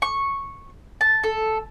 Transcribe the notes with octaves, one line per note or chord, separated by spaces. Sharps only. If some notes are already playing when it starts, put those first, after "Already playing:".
C#6
A5
A4